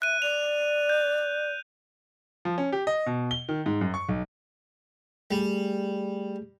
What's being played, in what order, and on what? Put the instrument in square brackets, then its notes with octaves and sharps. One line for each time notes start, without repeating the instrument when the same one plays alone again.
[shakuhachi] E5 [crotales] F#6 D#7
[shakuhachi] D5 [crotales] F7
[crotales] G6
[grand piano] F3
C#4
G4
D#5
B2
G7
D#3
G#2
F#2
C#6
B1
[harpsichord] G3 [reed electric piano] A3 G#4